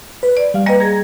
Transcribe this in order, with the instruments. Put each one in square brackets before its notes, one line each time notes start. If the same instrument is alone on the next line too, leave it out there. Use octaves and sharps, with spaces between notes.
[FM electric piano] B4
[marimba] D5
[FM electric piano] G3 F5
[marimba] G3 A#3 D#5 [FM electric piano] B4 G#5
[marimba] G#4 [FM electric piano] A#5 G#6 A#6